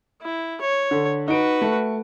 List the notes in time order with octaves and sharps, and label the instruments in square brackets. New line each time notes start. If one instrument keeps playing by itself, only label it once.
[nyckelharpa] E4
C#5
[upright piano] D3
[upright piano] D#4 D7 [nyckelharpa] F#4 B4
[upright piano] A3